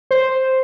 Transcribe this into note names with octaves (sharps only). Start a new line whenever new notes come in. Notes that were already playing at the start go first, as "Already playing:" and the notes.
C5